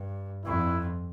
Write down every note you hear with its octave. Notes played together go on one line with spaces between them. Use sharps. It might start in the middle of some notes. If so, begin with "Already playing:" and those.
Already playing: G2
F2 E4